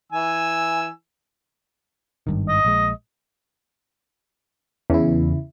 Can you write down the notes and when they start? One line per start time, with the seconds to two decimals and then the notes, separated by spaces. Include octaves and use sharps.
0.12 E3 G#5 E6
2.27 G#1 G2 D#3
2.49 D#5
2.65 A#1 G#3
4.90 E2 C#3 E4